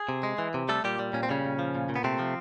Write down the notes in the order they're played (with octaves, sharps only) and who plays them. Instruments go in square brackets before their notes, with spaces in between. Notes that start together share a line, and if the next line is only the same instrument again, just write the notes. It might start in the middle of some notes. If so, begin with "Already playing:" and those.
Already playing: [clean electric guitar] G#4
C3
G#3
E3
C3
G3 A3 A4
A#2 G3 G4
G3
A#2 C#4
C4
C#3 G3 C#4
A#2
F3
A#2
A#2
B3
C3 A3 C4
F3